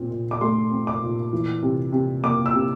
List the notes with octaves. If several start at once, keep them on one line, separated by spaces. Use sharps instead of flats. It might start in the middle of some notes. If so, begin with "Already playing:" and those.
Already playing: A#2 C4
A#2
D6
A3 C6
C4
D6
A#2
E3
C3
C3
A#3 D6
E6
C3